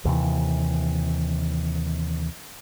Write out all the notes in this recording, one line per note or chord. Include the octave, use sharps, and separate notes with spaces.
D#2 C3 E3